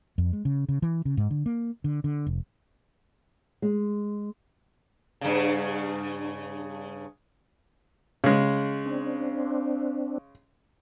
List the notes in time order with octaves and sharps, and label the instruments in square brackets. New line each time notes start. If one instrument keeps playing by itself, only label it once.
[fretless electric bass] F2
G#3
C#3
C#3
E3
C#3
G#2
D3
A#3
D3
D3
F1
[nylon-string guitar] G#3
[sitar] G2 C#3
[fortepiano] C#3 G#3
[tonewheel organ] C4 D4